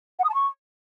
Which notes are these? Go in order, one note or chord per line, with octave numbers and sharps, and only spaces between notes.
F#5
D#6
A5
C#6